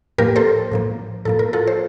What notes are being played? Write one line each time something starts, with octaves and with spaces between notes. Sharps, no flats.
A2 F3 A#3 G4 A#4
A4 C5
A2 F3 A#3
A2 F3 A#3 A4
A#4
F4 A4
C5